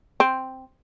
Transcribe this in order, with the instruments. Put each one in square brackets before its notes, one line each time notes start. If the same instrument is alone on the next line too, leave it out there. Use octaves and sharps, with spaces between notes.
[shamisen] C4